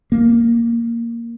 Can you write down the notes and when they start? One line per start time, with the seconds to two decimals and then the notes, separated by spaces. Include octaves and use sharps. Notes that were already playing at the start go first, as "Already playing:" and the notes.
0.12 A#3